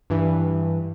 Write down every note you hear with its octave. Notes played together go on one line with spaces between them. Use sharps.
G2 E3